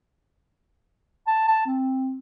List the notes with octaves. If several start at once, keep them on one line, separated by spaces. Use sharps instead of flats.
A5
A5
C4